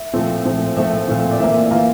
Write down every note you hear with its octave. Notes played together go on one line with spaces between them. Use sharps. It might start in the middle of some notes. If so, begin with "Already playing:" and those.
Already playing: E5
A#2 F3 A3 C4
A#2 F3 A3 C4
A#2 F3 A3 C4 E5
A#2 F3 A3 C4
D5
E3 A#3 E5
E5
E3 A#3 F4 F5